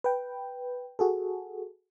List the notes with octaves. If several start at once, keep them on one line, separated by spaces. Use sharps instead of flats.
B4 G5
F#4 G#4 A4